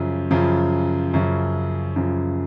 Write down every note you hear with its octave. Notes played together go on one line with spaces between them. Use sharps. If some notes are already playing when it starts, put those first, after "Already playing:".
Already playing: F#2 C#3 F3
F#2 C#3 F3
F#2 C#3 F3
F#2 C#3 F3